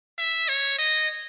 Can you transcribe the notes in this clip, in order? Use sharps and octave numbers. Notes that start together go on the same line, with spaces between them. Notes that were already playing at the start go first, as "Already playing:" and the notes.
E5
C#5
D#5